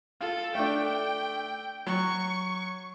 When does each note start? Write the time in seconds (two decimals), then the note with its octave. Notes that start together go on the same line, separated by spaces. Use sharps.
0.21 F4 A4
0.55 A3 D4 G5
1.87 F#3 C#6